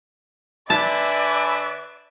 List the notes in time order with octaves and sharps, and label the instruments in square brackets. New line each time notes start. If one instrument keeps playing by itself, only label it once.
[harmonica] D3 G#5 B5 [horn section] B4 E5 [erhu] D5 [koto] A5